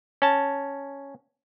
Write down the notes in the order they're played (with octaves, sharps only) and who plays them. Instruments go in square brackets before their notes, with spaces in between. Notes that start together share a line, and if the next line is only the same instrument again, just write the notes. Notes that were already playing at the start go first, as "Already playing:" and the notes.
[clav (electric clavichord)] C#4 A5